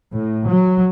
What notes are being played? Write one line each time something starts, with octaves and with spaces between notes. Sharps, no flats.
A2
F#3